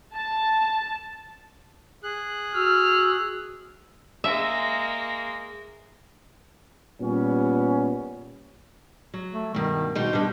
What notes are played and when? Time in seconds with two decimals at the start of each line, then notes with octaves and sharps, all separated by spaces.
0.15 A5
2.04 G#4 F#6
2.55 F#4 E6 F6
4.24 G#3 A#3 E5
7.01 A#2 G3 B3 C#4
9.14 F#3
9.31 A3
9.55 G2 B2 D#3
9.95 B2 G3 D#4 C5
10.13 B2 G3 D4